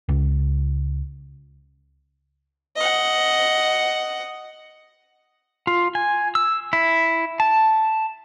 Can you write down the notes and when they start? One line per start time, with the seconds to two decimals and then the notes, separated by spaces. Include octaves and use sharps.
0.09 C#2
2.76 D#5 F#5
5.67 F4
5.95 G#5
6.35 E6
6.73 E4
7.40 A5